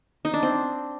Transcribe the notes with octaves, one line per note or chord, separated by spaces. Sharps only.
D#4
D4
C4